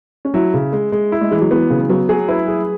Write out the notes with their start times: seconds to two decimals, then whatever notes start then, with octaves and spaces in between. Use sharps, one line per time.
0.25 C#4
0.34 F#3 E4
0.54 C#3
0.73 G#3
0.92 G#3
1.12 E4
1.21 G#3
1.31 E3 G#3
1.41 F#3
1.51 E3 B3
1.70 C#3
1.89 F#3 B3
2.09 F#3 G#4
2.28 E4 B4
2.48 G#4